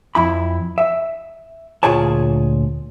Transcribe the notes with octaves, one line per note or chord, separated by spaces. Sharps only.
F2 E4 B5
E5
D2 A#2 F4 G#4 C#5 A5